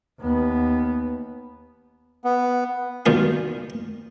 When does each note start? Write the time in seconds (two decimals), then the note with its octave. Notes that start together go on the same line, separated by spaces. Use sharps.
0.20 D#2 B3
2.24 B3
3.06 G2 B2 D#3 B3 F4